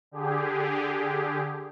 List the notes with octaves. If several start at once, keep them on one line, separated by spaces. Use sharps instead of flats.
D3 G4 G#4